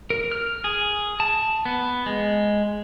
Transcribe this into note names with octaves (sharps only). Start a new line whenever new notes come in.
A#4
F6
G#4
A5
B3
G#3